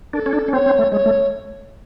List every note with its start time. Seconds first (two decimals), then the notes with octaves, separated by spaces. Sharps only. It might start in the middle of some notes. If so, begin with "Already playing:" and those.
0.13 D4 A#4
0.17 A4
0.26 C#4
0.33 D4
0.48 C#4
0.52 C4 C#5
0.66 C4
0.79 A3
0.92 G#3 C#5
1.06 A3